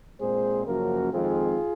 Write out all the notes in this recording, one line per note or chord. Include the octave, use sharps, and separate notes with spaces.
A#2 G#3 C4 G#4 C5
F#2 C#3 F3 A#3 F#4 A#4
F2 D#3 G#3 C4 F4 G#4